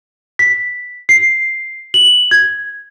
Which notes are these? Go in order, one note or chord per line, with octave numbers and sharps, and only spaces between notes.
B6
C7
F#7
G#6